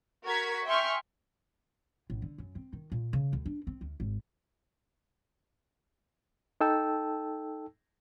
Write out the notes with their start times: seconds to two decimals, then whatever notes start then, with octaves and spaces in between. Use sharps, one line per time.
0.24 F#4 A#4 C#6 G#6 B6
0.65 E5 G5 G#5 C6 C#6 F6
2.10 A1
2.22 D3
2.38 F#2
2.55 C4
2.73 D#3
2.92 A#2
3.13 C#3
3.33 D2
3.46 D4
3.67 C4
3.81 D2
4.00 G#1
6.61 D#4 A4 G5 A5 E6